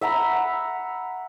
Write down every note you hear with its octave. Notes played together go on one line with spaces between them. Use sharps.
E5 F#5 A#5 B5